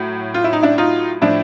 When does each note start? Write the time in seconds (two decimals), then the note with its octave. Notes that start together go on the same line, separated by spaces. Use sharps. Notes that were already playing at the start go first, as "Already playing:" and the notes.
Already playing: A2 F#3
0.34 F4
0.44 E4
0.53 D#4
0.63 D4 E4
0.78 D#4 F4
1.22 A2 F3 D4 E4